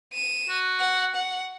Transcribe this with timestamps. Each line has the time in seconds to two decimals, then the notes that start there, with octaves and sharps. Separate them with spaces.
0.13 D#7 E7
0.49 F#4
0.80 F#5
1.15 F#5